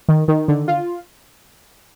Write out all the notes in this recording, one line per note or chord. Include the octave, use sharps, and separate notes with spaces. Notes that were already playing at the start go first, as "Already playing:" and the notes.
D#3
D#3
D3
F4